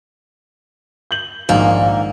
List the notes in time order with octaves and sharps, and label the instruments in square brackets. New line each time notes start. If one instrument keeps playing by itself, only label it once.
[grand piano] G6 F#7
[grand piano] A#1 G#2 D#3 [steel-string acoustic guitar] A#3